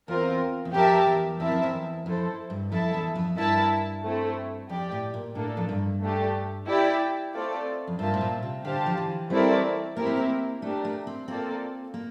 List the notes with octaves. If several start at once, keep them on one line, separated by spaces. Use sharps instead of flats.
E2 C4 F4 A#4
E2
F2 G4 A#4 E5 A5
E2
E2 C4 E4 A#4 E5 A5
F2
E2
F2 E4 A4 C5
G2
F2 E4 A4 E5 A5
E2
F2
G2 E4 A#4 E5 A5
A3 C4 E4
F2 G4 D5 G5
A2
A#2
A2 A#3 D4 A4
F2
G2
A3 D4 G4
E4 G4 D5 G5
A3 C4 F4 A4 D5
F2
G2 A#3 F4 C5 E5 A5
A2
A#2
C3
D3 G4 C5 F5 A5
F3
E3
G3 A3 C4 E4 A#4 D5
A#3 C4 E4 G4 A#4
A3
A#3
A3 D4 G4 A#4
A3
C4
A#3 C4 F4 A4 D5
A#3